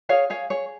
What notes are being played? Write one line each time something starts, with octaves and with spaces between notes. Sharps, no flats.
G#4 C#5 F5
G#4 C#5 F5
G#4 C#5